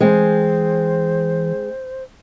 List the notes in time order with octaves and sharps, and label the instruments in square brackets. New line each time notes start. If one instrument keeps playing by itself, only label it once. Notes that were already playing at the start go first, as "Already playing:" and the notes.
[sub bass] E3 [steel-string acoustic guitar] G#3 C4 [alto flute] C5